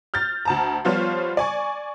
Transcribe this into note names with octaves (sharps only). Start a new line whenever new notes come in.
F6 G6 A6
D2 A5 A#5
F3 G3 B3 F4 C5 C#5
D5 G#5 C#6